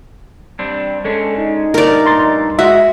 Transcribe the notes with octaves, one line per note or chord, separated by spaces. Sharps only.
G3 C4 D4
G#3 C#4 D4 A4
D#4
G2 A#2 A3 A#4 D5
A#5 C6 A6
G#3 F#4 D#5 E5